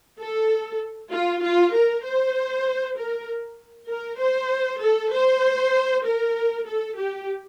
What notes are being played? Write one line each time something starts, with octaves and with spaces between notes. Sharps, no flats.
A4
F4
F4
A#4
C5
A#4
A#4
C5
A4
C5
A#4
A4
G4